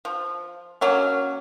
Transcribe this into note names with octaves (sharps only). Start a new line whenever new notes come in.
F3
F#3 A#3 C#4